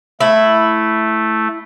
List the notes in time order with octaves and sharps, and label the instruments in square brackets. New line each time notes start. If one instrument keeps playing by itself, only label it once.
[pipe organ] A3 [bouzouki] E4